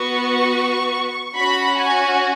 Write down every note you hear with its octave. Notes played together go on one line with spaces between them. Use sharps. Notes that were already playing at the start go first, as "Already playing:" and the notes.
Already playing: B3 F#4 C#6
C#4 F#4 B5
G#5